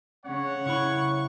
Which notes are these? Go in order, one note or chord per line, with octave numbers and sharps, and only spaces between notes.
C#3 C#5 F#5
C#3 E4 B5 C#6